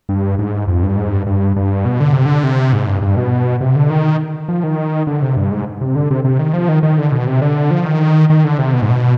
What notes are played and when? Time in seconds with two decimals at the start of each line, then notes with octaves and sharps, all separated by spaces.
0.09 G2
0.39 G#2
0.67 F2
0.83 G2
0.97 G#2
1.11 G2
1.27 G2
1.56 G2
1.85 B2
2.00 D3
2.13 C3
2.26 D3
2.44 C3
2.73 G#2
2.88 G2
3.02 G2
3.17 B2
3.61 C3
3.76 D3
3.90 D#3
4.49 F3
4.63 D#3
5.07 D3
5.22 C3
5.37 G2
5.51 G#2
5.81 C3
5.95 D3
6.11 C3
6.24 C3
6.39 D#3
6.53 F3
6.69 D#3
6.83 D#3
6.98 D3
7.12 B2
7.27 C3
7.42 D3
7.71 F3
7.86 D#3
8.30 D#3
8.45 D3
8.59 C3
8.73 B2
8.82 G#2
8.90 B2